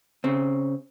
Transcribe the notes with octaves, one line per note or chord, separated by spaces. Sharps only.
C#3 C4